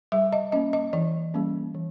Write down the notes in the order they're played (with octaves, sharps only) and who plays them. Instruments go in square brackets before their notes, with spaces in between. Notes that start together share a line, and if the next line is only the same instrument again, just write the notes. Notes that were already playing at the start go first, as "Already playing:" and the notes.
[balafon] G3 E5
D#5
A#3 C#4 D#5
D#5
E3 D5
G3 A#3 C#4
E3